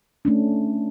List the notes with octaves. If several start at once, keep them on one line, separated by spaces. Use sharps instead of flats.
A3 C#4 D4